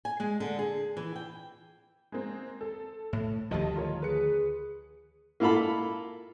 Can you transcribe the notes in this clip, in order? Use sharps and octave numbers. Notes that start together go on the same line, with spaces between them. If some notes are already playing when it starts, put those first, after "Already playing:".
G#5
G#3
D3
G#4
E3
G5
G#3 A#3 C4
A4
A2
D2 D#3 F3 G3 D#5 A5
F4 A#4 C#5
G#4 B4 C#7
A#3 E4 F4 A4 B5